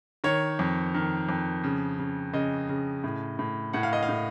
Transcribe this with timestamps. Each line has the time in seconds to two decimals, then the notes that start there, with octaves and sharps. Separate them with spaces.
0.24 D#3 C#5
0.59 F2
0.94 D#3
1.29 F2
1.64 C#3
1.99 C#3
2.34 C#3 D#5
2.69 C#3
3.04 A2
3.39 A2
3.73 A2 F#5
3.83 F5
3.93 D#5
4.03 F5
4.09 A2